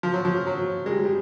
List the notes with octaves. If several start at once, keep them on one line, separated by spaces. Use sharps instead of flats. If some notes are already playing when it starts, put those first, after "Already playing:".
F3
F#3
F3
F#3
G#3
G3
G3